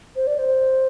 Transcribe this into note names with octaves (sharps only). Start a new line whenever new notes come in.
C5
D5
C5